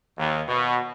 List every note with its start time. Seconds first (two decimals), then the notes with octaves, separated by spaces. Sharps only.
0.17 D#2
0.48 B2